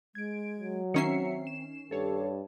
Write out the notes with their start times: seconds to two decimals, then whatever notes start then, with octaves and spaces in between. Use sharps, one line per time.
0.15 G#3 G#6 D7
0.59 F#3
0.94 D#3 C4 C#4 E5 A#5 C7 C#7
1.47 E7
1.91 G2 G4 A4 C#5 A5